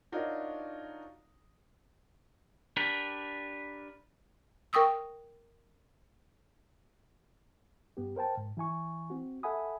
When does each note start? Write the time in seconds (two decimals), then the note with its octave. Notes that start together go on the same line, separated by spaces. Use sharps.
0.12 D4 D#4 F4 F#4 A#4 C#5
2.77 D4 G4 A#4 B4
4.73 A#4 G5 C#6 D#6 E6
7.97 G2 B3 G4
8.16 A#4 C5 G5 A5
8.37 G#2
8.57 E3 E4 G#5 C#6
9.10 C4 F#4
9.43 A4 E5 F#5 G#5 B5 D#6